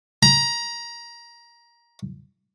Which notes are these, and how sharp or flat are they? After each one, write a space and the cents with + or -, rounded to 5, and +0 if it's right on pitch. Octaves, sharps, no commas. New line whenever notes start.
A#5 +20